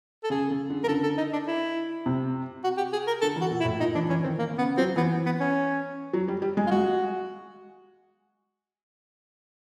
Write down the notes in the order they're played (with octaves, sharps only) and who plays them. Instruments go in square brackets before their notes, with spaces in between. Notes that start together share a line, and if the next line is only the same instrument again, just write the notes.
[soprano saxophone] A4
[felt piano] C#3 [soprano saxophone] G#4
[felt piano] C#3
D3
[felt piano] C#3 [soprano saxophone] A#4
[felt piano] D3 [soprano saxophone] A4
[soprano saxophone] A4
D#4
D4
E4
[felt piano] C3
[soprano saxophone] F#4
G4
G#4
A#4
[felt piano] D3 [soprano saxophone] A4
[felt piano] E3
[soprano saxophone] F#4
[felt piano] A#2
[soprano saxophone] E4
[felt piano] A2
[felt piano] A#2 [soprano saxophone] D#4
[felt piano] E3 [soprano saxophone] D4
[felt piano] E3 [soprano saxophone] C#4
[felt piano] D#3 [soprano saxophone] C4
[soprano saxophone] A#3
[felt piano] C#3 [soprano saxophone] B3
[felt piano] F#3 [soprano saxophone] C4
[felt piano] E3 [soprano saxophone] B3
[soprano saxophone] B3
C#4
[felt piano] F#3
G3
G3
G#3
[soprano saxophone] F4
[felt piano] G#3 [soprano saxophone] F#4